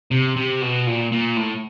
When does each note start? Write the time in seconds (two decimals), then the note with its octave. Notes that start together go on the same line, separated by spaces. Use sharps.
0.11 C3
0.36 C3
0.61 B2
0.87 A#2
1.12 A#2
1.37 A2